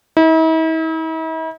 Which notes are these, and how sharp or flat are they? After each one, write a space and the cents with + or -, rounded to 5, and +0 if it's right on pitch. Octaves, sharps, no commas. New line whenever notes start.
E4 -45